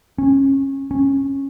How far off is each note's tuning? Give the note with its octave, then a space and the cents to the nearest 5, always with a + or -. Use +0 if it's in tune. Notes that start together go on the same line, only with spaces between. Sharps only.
C#4 -20
C#4 -15